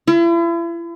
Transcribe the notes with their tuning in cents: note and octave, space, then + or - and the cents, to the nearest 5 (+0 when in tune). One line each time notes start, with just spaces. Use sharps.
E4 +40